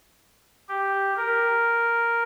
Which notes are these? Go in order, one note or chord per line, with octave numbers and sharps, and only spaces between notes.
G4
A#4